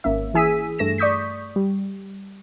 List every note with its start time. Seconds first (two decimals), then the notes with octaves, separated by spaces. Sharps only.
0.04 G#1 A#3 C#4 E5
0.34 E3 E4 G#4 E6 B6 D#7
0.78 G2 A3 A#6 E7
0.98 D5 C#6 D#6 G6 B6
1.56 G3